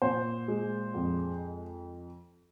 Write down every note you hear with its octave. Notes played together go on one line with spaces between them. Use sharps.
A#2 C5
G#3
F2